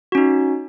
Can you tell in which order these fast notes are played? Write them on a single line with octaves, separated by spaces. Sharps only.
F#4 C#4 D#4